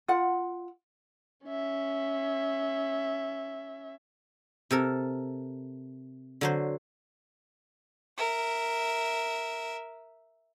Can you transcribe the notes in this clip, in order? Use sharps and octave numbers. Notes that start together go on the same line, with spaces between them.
F4 F#5
C#4 E5
C3 A4 A#4
D3 F#3 C5
A#4 E5